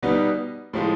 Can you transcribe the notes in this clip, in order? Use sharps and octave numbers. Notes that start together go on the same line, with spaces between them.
B2 G3 B3 D#4
A2 F3 G#3